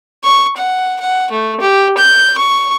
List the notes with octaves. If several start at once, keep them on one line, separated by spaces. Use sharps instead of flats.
C#6
F#5
F#5
A3
G4
G6
C#6